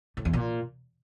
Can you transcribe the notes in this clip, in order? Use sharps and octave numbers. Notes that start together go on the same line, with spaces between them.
A2
E2
A#2